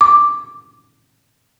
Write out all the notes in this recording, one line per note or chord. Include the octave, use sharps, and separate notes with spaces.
D6